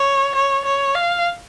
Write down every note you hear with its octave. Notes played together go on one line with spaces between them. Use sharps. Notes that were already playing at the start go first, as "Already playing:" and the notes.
Already playing: C#5
C#5
C#5
F5